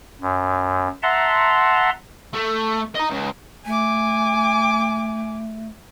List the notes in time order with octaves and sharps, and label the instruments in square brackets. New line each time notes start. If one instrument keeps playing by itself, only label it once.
[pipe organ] F#2
E5 F#5 A5 A#5 C6
[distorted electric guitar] A3
D#5 A#5
C#2
[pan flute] A3 [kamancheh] G#5 D6